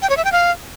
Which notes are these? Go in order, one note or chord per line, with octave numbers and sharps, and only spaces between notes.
G5
C#5
E5
G5
F5